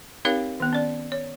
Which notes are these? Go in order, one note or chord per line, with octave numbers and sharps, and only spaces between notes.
C4 D#4 G4 A#4 C#5 F5
D#3 B3
C#4 D5
C#5